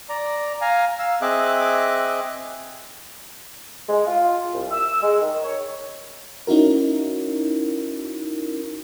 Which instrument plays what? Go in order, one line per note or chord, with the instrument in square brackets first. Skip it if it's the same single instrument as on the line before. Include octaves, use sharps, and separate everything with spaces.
[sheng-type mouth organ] D5 A#5
F5 G#5 A#5
F5 E6
C4 G#4 D#5 E5 D6 F#6
[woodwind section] G#3
F4
C2
E6
G#3
D#3
C#5
[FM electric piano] C#4 D#4 E4 F#4 A#4